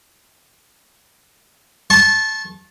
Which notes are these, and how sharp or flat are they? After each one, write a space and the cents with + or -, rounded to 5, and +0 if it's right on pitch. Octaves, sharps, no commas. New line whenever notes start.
A5 -15 C#6 -40